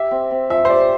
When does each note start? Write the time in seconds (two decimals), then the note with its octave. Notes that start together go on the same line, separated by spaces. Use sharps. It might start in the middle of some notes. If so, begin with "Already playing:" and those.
Already playing: G4 E5
0.11 C4
0.31 C4
0.50 F3 E5
0.65 C5
0.69 G4 D5